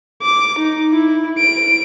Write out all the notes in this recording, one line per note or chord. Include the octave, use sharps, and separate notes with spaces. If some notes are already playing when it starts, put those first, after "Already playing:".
D6
D#4
E4
D7